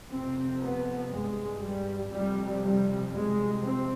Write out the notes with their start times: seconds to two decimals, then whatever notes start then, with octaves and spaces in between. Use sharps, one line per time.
0.11 F2 C3 C4
0.61 B3
1.11 G2 G#3
1.62 G3
2.12 F2 C3 G3
2.62 G3
3.13 F2 C3 G#3
3.63 C4